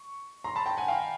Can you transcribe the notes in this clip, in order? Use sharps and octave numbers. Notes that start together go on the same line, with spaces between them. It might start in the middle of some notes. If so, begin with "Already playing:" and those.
Already playing: C#6
A#5 C6
A5 B5
G5 A5
F#5 G#5
F5 G5